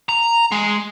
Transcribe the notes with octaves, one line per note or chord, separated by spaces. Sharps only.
A#5
G#3